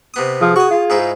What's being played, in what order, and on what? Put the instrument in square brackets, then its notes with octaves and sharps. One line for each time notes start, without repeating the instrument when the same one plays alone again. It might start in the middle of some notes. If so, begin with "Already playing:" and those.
[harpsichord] C3 B3 D#6
[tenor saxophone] F3 [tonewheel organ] G#4
[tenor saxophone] F#4 [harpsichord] C#6 D#6
[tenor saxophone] F4
[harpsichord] G#2 D#4 E4